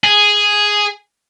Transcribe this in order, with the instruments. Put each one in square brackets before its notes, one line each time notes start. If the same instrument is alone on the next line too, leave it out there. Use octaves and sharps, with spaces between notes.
[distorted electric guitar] G#4